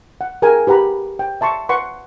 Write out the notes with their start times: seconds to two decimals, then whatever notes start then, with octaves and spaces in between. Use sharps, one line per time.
0.21 F#5
0.42 G#4 A#4 G5 G#5
0.67 G4 B4 F#5 A#5 B5
1.19 G5
1.41 E5 A5 C6 C#6
1.69 B4 F#5 C6 C#6